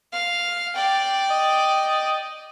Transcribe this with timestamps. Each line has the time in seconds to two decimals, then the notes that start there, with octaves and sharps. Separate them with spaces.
0.13 F5
0.76 D5 G5
1.31 D#5